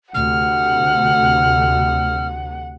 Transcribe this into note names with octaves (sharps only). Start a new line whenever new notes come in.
D2 C3 F#5 F6